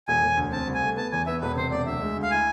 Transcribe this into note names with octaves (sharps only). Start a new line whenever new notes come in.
E1 G#5
E1
D2
C4 A5
C2
G#5
A3
B3 A5
E2 G#5
B3 E5
E1 B4
C3 C5
E1 D5
D2 E5
G#3
D2
F5
E4 G#5